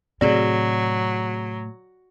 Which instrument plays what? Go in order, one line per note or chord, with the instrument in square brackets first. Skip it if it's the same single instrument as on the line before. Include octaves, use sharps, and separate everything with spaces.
[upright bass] A2 C3 [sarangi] F#3 [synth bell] C4 F#4 G#4 [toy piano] D5